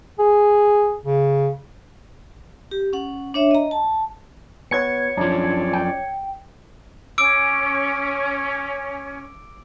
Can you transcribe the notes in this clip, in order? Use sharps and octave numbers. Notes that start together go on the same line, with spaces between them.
G#4
C#3
G4
C#4 F#5
D4 C#5 E5
D#5 A#5
A5
B3 F#4 C#5 G#6 C#7
F#2 F3 C#4 D4 D5
G5
C#4 D6 E6 D7